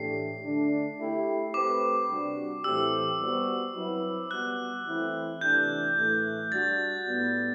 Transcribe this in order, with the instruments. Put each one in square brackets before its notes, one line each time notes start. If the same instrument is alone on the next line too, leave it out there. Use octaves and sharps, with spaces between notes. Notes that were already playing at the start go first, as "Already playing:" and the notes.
Already playing: [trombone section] A2 E3 A3 D4 G4 [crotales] C7
[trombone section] D3 A3 D4
A3 E4 G4
[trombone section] A3 C4 G4 B4 [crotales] D6
[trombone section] C3 G3 D4 F#4
[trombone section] A2 E3 A3 C4 G4 [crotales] E6
[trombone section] G3 B3 F#4 C5
F#3 C4 E4 B4
[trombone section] G3 B3 F#4 [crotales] F#6
[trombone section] E3 A3 C4 E4
[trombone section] C3 E3 A3 D4 G4 [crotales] G6
[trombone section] A2 E3 A3
[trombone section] G3 D4 F#4 [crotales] A6
[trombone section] A2 G3 B3